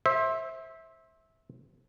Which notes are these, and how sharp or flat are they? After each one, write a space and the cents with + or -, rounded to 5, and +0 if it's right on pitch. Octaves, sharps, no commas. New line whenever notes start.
C5 +25 E5 -15